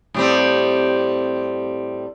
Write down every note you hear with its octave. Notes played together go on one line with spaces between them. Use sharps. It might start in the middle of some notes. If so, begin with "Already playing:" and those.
A2 G3 C4